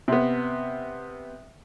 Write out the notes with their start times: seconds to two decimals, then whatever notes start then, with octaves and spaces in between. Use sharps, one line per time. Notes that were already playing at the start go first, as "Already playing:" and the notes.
0.08 C3 B3